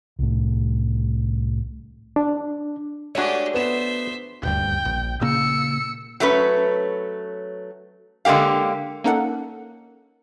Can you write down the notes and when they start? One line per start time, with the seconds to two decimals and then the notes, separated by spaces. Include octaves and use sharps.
0.19 C2 A2
2.16 D4
3.15 G#3 A3 D4 F#4 G4 C#5
3.54 B3 C5 E5 E7
4.43 D#1 D2 G2 G5
4.85 A#1
5.21 A#2 C#3 A#3 E6 C#7
6.20 F#3 A3 C#4 B4
8.25 D3 G#3 A#3 G4 F5
9.04 A#3 C#4 D#4 A4 A#4 F#5